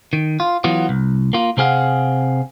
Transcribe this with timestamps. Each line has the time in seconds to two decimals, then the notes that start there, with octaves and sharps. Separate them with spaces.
0.13 D#3
0.40 F4
0.64 E3 F#3 B3 F4
0.89 C2
1.33 A#3 F4
1.57 C3 C4 G#4 F5 F#5